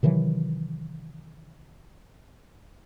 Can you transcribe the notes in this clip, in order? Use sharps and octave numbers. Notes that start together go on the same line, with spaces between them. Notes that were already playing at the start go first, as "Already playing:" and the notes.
C3 D#3 E3 F#3